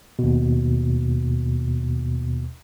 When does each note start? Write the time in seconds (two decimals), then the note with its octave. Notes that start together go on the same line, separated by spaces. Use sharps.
0.19 D#2 B2